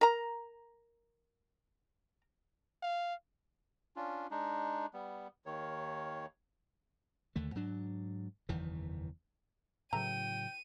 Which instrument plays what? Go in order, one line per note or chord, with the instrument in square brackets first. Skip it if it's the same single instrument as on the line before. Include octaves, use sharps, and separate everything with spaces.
[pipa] A#4 A#5
[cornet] F5
[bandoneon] C#4 D4 F4
G#3 D4 D#4
G3 B3
D#2 D#3 C#5
[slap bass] D#2 D3 A3
G#2 F#3 D4
F#1 E2 D#3 E3
[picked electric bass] A2 C#3 F#3 [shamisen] E3 A4 A#5 [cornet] G5 [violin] D#7